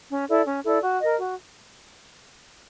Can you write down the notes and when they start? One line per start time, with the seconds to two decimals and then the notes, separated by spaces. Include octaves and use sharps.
0.10 C#4
0.28 E4 A4 D5
0.46 C#4
0.64 E4 A4 D5
0.82 F#4
1.00 A#4 D#5
1.18 F#4